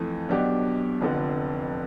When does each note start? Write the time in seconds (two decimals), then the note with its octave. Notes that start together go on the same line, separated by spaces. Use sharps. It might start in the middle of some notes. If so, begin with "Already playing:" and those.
Already playing: F2 E3 A3
0.29 B1 B2 B3 D4 G4
1.01 F1 F2 D3